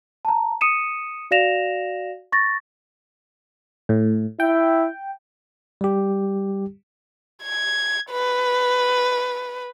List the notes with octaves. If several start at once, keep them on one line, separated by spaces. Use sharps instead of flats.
A5 A#5
D#6 C#7 D#7 E7
F#4 D5 F5 A#6 E7 F7
C#6 A6 A#6
A2
E4 G5
G3 G4
G#6
B4